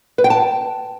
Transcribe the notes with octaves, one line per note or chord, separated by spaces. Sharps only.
B4
G5
A5